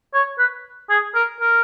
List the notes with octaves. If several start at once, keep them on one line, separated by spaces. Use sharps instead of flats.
C#5
B4
G#4
A#4
A#4